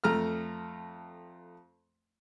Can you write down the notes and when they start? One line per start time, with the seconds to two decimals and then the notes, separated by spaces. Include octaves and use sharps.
0.04 F2 A3 A#5 F6